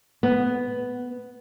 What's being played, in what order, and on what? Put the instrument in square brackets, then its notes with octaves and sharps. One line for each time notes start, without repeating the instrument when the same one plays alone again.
[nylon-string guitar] B3